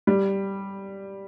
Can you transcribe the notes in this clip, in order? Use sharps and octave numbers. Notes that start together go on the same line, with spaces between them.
G3